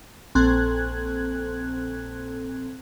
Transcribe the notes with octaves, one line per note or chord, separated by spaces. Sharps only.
A#1 C4 A4 F#6 G#6